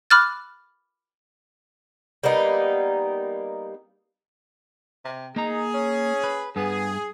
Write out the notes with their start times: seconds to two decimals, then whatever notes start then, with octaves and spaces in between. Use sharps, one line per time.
0.10 B5 D6 F6 F#6 A6
2.23 G3 A#3 B3 D#4
5.05 C3
5.36 A#3 D#4 G#4 A#5
5.74 C#4
6.24 B4
6.56 G2 B3 G#4